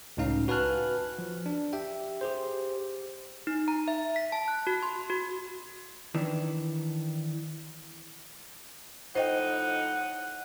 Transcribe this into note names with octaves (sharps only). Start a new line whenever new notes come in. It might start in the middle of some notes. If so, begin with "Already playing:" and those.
C#2 A2 C#4 D#4 F5 A#5
F#4 B4 G#5 A5 F6 F#6
F3
D4
G4 E5 G5
G4 G#4 C5
D#4
A#5
E5
B6
A5
F#6
F#4
C6
F#4
D#3 E3 D4
A2 F3 D#4 C5 D#5 F#5 G5